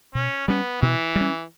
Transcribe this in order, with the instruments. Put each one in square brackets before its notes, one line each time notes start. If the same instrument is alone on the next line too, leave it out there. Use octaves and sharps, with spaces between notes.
[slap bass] B2 [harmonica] C#4
[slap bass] G3 C#4 [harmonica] B3
[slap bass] B2 [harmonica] E3
[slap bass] G3
C#4